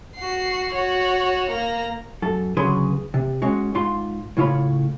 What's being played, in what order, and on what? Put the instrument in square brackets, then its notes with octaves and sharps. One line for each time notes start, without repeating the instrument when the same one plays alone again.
[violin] F#4 C7
F#4 C#5
A#3 A#5
[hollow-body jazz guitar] F#2 A4
D2 C#3 F#3 G#4 B4 C6
C3
G#3 C#4 F#4
G#2 F4 C6
A2 C#3 F4 C#5 B5